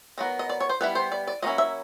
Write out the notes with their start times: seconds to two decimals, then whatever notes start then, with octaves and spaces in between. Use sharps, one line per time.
0.18 D#3 F#3 B3
0.39 D#5
0.49 D5
0.60 C#5
0.69 C5
0.81 G3 B3 E4 B4
0.95 C5
1.12 D5
1.27 D5
1.42 F#3 A#3 C#4 E4 D#5
1.58 E5